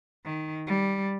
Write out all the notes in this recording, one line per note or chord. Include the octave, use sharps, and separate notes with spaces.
D#3
G3